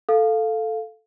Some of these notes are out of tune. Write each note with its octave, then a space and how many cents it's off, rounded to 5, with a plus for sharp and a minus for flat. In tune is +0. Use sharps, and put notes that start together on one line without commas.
A4 +0 F5 +0